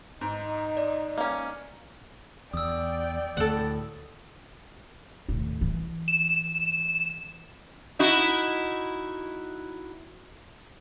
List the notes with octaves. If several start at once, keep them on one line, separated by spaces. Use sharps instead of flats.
G#2 D#4
D5
A#3 C#4
E2 D5 G5 D#6 E6
D2 A2 A4 F#5
D#2 A2
E3
E7
D#4 E4 F#4